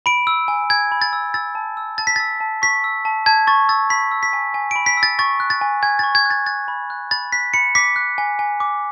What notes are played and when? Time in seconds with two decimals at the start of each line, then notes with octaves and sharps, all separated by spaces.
0.06 B5 D7
0.27 E6
0.48 G#5
0.70 G#5 G#6
0.92 B5
1.02 A6
1.13 E6
1.34 E6 A6
1.55 A5
1.77 E6
1.98 A5 A6
2.07 B6
2.16 E6 A6
2.40 A5
2.62 C#6 B6
2.84 E6
3.05 A5
3.26 A5 G#6
3.47 C#6 A6
3.69 E6 A6
3.90 B5 B6
4.12 E6
4.23 B6
4.33 G#5
4.54 G#5
4.71 B5 D7
4.86 B6
4.97 E6
5.03 A6
5.19 C#6 A6
5.40 F#6
5.50 A6
5.61 G#5
5.83 G#5 G#6
5.99 C#6 A6
6.15 G#6
6.25 F#6 A6
6.46 F#6 A6
6.68 B5
6.90 F#6
7.11 B5 A6
7.32 F#6 B6
7.54 B5 C#7
7.75 D6 B6
7.96 F#6
8.18 G#5
8.39 G#5
8.60 D6